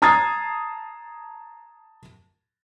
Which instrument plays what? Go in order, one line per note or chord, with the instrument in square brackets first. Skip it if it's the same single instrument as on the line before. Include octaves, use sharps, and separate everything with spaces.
[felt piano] A5 A#5 D#6 G#6 A6 C7